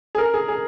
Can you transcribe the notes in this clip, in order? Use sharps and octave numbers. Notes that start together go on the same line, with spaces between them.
G#4
A#4
G#4
G#4